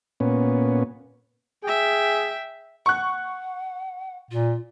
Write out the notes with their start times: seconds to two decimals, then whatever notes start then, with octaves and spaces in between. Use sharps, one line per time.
0.20 A#2 B3 C#4
1.64 G#4 E5 G5
2.86 F#5 C#6 F#6
4.31 A#2 F4